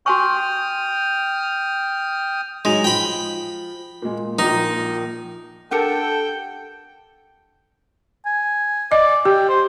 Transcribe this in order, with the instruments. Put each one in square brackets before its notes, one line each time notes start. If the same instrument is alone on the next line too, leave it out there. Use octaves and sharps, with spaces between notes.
[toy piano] F#4 G#5 C#6 [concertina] G5 D#6 F6
[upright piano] F#3 D#4 F7 [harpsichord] G#3
[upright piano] F3 [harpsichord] G5 B5
[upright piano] A#2 G#3
[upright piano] A#1 A#2 [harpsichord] D#4
[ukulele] D4 G4 A#4 [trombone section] A4 [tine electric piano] F#5 C#7 [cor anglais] G5
[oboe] G#5
[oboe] D5 [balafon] D#5
[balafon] G4 [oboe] G5
[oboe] C5